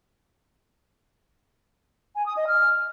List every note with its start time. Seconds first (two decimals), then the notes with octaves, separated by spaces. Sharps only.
2.15 G#5
2.25 D#6
2.36 D#5
2.47 F6